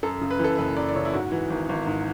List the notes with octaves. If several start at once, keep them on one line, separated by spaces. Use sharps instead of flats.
F#2 A4
C#3
B4
E3
A4
F#1 B4
F#2 D5
D5
C#3 C#5
E4
G#2 F#4
E3
G#1
G#1
G#2